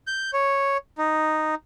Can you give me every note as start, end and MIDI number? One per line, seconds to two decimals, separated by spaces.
0.07 0.31 91
0.33 0.77 73
0.98 1.55 63